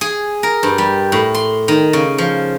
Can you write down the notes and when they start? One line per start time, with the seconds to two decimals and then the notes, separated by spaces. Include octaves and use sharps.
0.01 G#4
0.43 A#4
0.63 G2
0.78 G3
1.12 A2
1.34 C6
1.68 D#3
1.93 C#3
2.18 F3